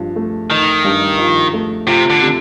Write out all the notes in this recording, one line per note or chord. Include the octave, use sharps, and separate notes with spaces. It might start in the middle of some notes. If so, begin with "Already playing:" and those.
Already playing: G2 F3
A3
D#3 D#4
G2
F3
A3
C3 F4
D3
C3